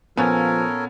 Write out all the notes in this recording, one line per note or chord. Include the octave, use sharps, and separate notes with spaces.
A#2 F3 B3 C#4 A4 A#4 C#5